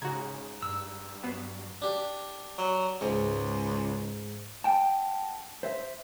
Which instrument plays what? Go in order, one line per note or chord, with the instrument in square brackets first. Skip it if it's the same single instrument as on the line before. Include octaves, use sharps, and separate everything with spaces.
[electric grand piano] G#2 G#4 A#5 [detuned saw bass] C#3 [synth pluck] F#4 G#6
[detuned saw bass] G2 [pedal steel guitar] E6
[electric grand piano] F#3 B6 C7 [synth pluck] B3
[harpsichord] D4 G4
[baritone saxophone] F#3
[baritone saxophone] C#2 [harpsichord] G#2
[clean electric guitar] F#5 G5 A5
C5 E5